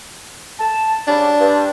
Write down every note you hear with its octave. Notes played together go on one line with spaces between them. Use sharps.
A5
C#3 F#3 G3 D4
G2